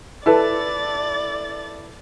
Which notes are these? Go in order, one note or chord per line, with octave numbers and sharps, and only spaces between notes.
E4 A4 B4 D5 A6